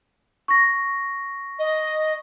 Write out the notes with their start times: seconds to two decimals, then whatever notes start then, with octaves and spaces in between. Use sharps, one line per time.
0.48 C#6 A#6
1.59 D#5